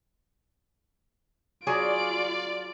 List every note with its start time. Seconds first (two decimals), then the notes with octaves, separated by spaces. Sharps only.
1.67 F#3 F4 G#4 D5 G#5 D7